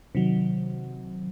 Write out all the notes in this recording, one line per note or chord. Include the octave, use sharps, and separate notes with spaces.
C3 D#3 F#3